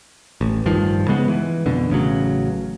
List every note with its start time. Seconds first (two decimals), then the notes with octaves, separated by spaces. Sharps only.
0.41 A1
0.66 G2 D#3 F3
1.08 C#3 G#3 B3
1.28 E3
1.66 F2 B2 D3
1.90 A1 C#3 F#3